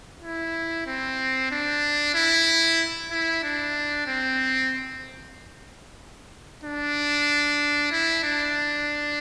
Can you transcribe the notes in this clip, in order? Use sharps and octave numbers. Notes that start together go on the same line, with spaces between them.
E4
C4
D4
E4
E4
D4
C4
D4
E4
D4